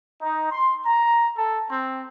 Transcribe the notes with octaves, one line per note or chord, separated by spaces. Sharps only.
D#4
C6
A#5
A4
C4